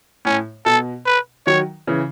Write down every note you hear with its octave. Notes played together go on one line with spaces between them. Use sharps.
A2 C#4
B2 A4
B4
D#3 F#3 C#5
C#3 E3